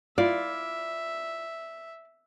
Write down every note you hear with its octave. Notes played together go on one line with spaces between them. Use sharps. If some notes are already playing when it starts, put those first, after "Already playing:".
E4 F4 D5 E5